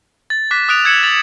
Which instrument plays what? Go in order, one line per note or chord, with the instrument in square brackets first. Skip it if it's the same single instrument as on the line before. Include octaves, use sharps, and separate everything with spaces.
[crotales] A6
D6 F#6 B6
D#6 F#6 D7 F7
E6 G#6 C#7 E7 F#7
A6 F7 F#7